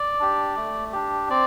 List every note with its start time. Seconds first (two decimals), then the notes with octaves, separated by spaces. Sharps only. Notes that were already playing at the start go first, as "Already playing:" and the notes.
Already playing: D5
0.20 D4 G4
0.56 A3
0.92 D4 G4
1.30 C4 D5